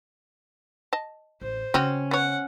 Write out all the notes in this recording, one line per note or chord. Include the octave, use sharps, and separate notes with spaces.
D#5 A5
A1 C5
C#3 C4 C#4 F#4
B3 C#5 F#5